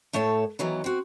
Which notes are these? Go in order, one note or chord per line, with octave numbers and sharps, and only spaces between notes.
A2 A3 A4 C#5 A5
D#3 E3 F#3 B3
C4 F#4